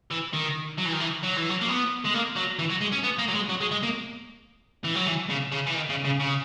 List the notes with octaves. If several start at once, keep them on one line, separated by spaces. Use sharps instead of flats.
E3
D#3
F#3
E3
D#3
E3
F#3
E3
F#3
A#3
B3
G#3
A#3
F#3
E3
F#3
G#3
C#4
B3
A#3
F#3
G#3
F#3
G#3
G#3
A#3
E3
F#3
E3
C#3
C#3
E3
D#3
C#3
C#3
C#3